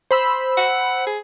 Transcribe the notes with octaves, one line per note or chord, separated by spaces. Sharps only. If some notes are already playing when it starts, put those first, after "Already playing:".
C5 B5 E6
F#5
G#4